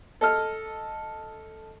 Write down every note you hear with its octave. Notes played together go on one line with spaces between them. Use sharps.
A4 D#5 F6